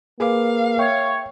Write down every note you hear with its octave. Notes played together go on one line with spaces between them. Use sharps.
A#3 G#4 B4 F5 D6
C#5 E5 G5 C#6